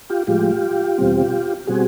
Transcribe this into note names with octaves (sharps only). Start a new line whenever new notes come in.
F4 G4
A2 F3 G#3 F4 G4
E2 B2 G3 C4
B2 G3 C4 F#4 G#4